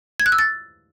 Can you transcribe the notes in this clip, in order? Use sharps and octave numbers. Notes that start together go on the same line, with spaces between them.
G#6
F#6
E6
A6